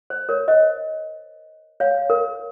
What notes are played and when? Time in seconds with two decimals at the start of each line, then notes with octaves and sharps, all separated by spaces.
0.10 C5
0.29 A#4 C#5
0.48 C5 D#5
1.80 C#5 F5
2.10 A#4